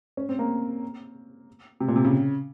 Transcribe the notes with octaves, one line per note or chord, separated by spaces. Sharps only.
C#4
C4
A#3
C3
A#2
C3
C#3